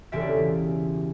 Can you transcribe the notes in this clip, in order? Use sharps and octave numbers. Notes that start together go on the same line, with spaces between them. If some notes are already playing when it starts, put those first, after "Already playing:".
E1 C#3 G4 D5 E5